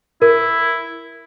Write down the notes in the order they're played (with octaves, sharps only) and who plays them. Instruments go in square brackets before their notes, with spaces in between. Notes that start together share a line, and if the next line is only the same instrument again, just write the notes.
[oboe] E4 [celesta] A#4